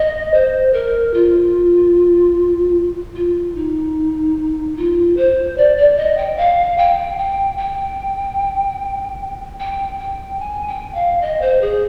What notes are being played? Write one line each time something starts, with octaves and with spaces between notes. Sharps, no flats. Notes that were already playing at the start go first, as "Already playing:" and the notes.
Already playing: D#5
C5
A#4
F4
F4
D#4
F4
C5
D5
D5
D#5
G5
F5
G5
G5
G5
G5
G5
G#5
G5
F5
D#5
C5
G#4